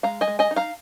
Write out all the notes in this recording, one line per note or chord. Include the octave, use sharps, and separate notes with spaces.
G#3 F5 A#5
D#5 G#5
G#3
D#5 G#5
D#4
F5 A#5